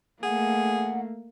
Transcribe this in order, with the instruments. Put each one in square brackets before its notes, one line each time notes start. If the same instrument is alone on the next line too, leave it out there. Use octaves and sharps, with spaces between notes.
[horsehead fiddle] A3 A#3 [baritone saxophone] G#4 [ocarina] F#5